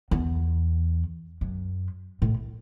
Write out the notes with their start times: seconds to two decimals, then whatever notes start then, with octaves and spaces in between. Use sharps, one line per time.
0.11 E2
1.41 F#2
2.22 A2